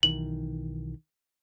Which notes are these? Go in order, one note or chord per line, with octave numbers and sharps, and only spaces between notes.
B1 D#3 E3 F#7